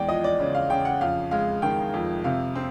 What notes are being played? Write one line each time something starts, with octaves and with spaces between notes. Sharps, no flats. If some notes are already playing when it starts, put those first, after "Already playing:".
Already playing: E2 G#3 D5 G5
F3 D#5
D5
C#3
F5
C#3 G5
F#5
F2 F5
G#3 F5
D#3 G5
F2
C3 F5
C4